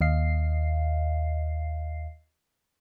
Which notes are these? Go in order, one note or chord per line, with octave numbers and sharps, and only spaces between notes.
D#2 D#5 F5 C7